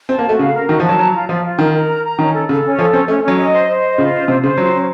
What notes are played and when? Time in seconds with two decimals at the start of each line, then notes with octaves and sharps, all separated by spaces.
0.09 C4 A5
0.19 A#3
0.24 A3 F#4
0.39 C#3 F5
0.54 A#4
0.69 D#3 F#4
0.80 F3
0.84 F#3 A5
0.99 F#3 A#5
1.14 F4
1.29 F3 F4
1.44 F4
1.59 D#3 A#4
1.73 A#4
1.88 A#5
2.03 A#5
2.19 D#3 C#4
2.34 A4
2.49 C#3 A4
2.64 C#4
2.78 F3 A4
2.93 C4 C#4
3.08 A3 C#4
3.23 F#3 C#4
3.38 D#5
3.53 C5
3.68 C5
3.84 D#5
3.98 C#3 F4
4.13 C5
4.28 C3 C5
4.42 C#3 C5
4.57 F#3 F4
4.73 C#4